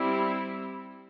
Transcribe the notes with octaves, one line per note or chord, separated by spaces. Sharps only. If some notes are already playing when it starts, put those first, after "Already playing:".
Already playing: G3 C4 E4